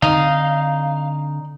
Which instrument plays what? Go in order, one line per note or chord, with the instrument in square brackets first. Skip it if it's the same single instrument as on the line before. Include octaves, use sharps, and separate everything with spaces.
[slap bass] D3 C4 [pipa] D#4 [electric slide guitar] F5